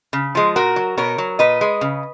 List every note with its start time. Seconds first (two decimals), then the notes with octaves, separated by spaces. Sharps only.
0.13 C#3
0.35 F3 G#3
0.56 A#2 F#4 A#4
0.76 F#3
0.97 B2 A#4 C#5
1.18 F#3
1.39 A#2 B4 D#5
1.61 G#3
1.81 C#3